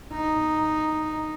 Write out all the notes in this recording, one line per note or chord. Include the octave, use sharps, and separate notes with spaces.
D#4